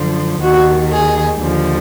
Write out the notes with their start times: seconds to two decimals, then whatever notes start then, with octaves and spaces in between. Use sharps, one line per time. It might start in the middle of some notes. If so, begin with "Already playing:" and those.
Already playing: F#2 D3 F3
0.41 D#2 D#3 F#4
0.90 G#4
1.41 D#2 D3 F3